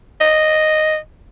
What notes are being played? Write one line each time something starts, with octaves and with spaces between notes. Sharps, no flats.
D#5